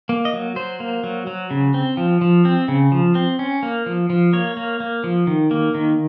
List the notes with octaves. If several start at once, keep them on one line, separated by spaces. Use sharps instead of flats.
A#3
D#5
F#3
F#3 C5
A#3
F#3
F#3
C#3
C4
F3
F3
C4
C#3
F3
C4
C#4
A#3
F3
F3
A#3 C#5
A#3
A#3
F3
D#3
A#3
D#3